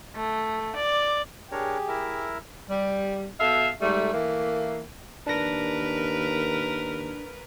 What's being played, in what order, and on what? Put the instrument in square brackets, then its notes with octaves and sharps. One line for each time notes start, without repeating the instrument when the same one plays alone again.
[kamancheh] A3
D5
[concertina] D4 A#4 C#5 [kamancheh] G4 G#4
[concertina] E4 A#4 E5
[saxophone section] G3
B2 A4 E5 F5
G#2 G3 A3
E3 A3 A#3
[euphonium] D#2 [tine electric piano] D4 A#6 [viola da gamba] A#4 B4